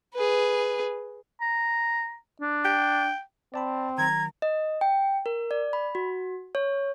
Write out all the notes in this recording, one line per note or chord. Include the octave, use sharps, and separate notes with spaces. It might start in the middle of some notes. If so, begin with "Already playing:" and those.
G#4 B4
A#5
D4
G5
C4 D5 A5 B5
D#3 F#3 A#5 G#6
D#5
G5
A#4
D5
B5
F#4
C#5